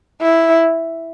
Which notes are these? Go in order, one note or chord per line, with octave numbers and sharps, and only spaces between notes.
E4